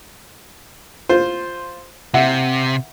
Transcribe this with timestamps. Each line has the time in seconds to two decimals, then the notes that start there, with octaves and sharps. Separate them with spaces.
1.09 F4 C5
2.14 C3 E5 F#5